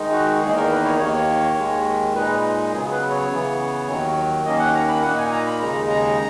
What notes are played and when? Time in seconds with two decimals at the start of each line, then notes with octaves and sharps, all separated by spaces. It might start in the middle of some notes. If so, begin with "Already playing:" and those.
Already playing: D#3 G#3 D#4
0.12 F#4
0.42 E2 D#3 A#3 D#4 G#4
0.56 A#4
0.71 B4
0.85 C#5
0.99 D#2 D#3 A#3 C#5
1.57 D#2 D#3 G#3
2.14 A#2 G#3 D#4 B4
2.72 C#3 F#3 B3 G#4
2.92 B4
3.11 C#5
3.31 C#3 E3 B3
3.88 D#2 D#3 F#3
4.45 D#2 D#3 A#3 C#4 D#5
4.59 F#5
4.74 A#5
4.88 B5
5.03 A#2 A#3 D#4 F#5
5.17 G#5
5.32 A#5
5.47 B5
5.60 D#2 C#3 G#3 D#4 A#5
5.89 A#5